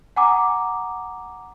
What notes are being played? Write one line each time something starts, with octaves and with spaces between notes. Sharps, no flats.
F#5 G#5 A#5 D6 D#6